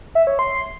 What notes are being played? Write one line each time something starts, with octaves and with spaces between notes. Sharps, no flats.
E5
C#5
C6